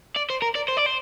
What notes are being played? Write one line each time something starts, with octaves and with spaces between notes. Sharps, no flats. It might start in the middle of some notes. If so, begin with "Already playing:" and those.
D5
C5
A#4
D5
C5
D5
C5